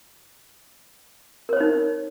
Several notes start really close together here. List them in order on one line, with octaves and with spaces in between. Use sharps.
A#4 C#5 C5 D#4